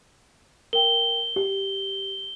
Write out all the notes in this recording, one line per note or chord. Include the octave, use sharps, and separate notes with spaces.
A#4 G5 G7
G4